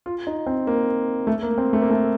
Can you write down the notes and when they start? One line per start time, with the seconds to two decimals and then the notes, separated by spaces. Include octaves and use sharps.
0.06 F4
0.27 D#4
0.47 C4
0.67 A#3
1.27 A3
1.43 A#3
1.58 C4
1.73 A3
1.82 A#3
1.91 A3